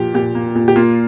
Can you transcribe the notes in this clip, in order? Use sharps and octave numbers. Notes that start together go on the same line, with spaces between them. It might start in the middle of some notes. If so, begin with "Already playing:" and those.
Already playing: A#2 F3 A#3 G4
A#2 G4
A#3
A#2
G4
A#3 F4